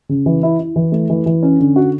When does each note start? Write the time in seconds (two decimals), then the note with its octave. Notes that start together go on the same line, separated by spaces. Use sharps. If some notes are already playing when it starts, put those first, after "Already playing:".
0.09 C#3
0.26 E3
0.43 E4
0.59 E4
0.76 E3
0.92 A3
1.10 E3
1.26 E3
1.43 C#4
1.60 D3
1.76 F#4